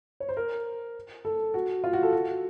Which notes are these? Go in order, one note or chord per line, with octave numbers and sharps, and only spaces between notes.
C#5
C5
A#4
A4
F#4
F4
F#4
A4
F#4